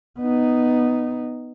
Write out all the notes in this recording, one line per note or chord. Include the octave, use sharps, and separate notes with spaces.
B3 D#4